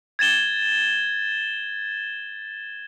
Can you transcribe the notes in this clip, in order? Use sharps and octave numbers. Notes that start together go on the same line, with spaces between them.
G#6 A6 E7 G7